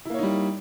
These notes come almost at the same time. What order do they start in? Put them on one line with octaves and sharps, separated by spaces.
E4 A#3 C#5 D#4 G3